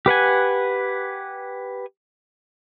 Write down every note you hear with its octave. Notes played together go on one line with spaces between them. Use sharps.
G4 B4 F#5 G#5